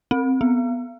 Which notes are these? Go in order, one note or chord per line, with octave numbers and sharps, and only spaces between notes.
C4
B3